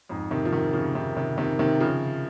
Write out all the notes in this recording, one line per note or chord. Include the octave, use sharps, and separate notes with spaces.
F2 G#2
C3 D#3
F3
C3 D#3
C#3 F3
C3 D#3
C3 D#3
C3 D#3
C3 D#3
C#3 F3